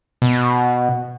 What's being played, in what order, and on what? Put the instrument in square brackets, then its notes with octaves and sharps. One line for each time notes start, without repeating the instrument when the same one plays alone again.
[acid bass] B2